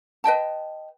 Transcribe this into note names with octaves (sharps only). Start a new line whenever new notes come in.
B4 D#5 G5 A5